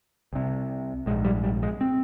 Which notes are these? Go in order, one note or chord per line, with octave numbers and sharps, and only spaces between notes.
C2 C3
A#1 G#2 G#3
G3
G3
G#3
C4